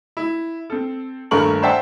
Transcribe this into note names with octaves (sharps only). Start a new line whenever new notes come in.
E4
C4 A4
D#1 G2 A3 A#4 C#6 F#7
C5 D5 E5 F#5 G5 A5